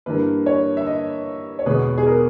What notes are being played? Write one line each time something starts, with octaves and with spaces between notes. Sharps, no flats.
G2 E3 A#3 B4
C#5
E5
D#5
C#5
E2 B2 G#3 B4
G#4
A#4